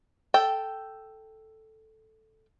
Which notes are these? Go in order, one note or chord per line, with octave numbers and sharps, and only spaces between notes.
A4 G5